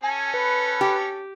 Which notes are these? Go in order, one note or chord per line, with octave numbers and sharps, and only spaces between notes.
C#4 A4 G#5
B4
G4